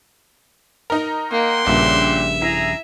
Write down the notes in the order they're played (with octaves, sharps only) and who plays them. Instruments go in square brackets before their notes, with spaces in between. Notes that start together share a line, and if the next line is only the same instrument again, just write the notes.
[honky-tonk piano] D#4 A#5 [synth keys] A#4
[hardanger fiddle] A#3 [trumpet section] F#5 G5 C6
[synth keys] A#1 G2 C#3 [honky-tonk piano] A#2 [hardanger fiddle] E5
[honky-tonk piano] E4 [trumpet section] G#4 A#5